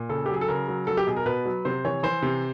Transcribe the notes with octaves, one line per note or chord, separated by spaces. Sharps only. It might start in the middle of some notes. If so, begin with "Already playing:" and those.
Already playing: A#2
C#3 A4
G4
F#3 G#4
A4
C#3 A#4
F#3
F#3 A4
G4
B2 G#4
A#4
B2 B4
F#3
C3 C5
E3 C#5
E3 C5
C3